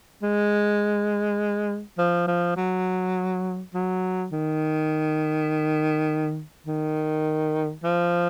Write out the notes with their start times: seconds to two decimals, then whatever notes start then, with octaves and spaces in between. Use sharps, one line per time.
0.22 G#3
1.98 F3
2.28 F3
2.57 F#3
3.74 F#3
4.32 D#3
6.67 D#3
7.84 F3